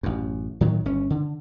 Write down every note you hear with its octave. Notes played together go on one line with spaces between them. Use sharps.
A1 F#2
A2 D#3 F#3
G1 C#4
D3